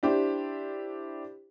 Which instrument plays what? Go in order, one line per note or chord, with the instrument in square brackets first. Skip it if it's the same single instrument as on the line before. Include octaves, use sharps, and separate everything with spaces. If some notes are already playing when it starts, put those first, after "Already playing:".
[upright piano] D4 E4 G4 C5